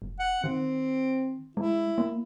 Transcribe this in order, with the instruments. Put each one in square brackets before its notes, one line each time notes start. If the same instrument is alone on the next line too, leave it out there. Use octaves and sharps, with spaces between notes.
[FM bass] F1
[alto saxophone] F#5
[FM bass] D#3 [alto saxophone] C4
[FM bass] G#3 [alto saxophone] E4
[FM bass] A#3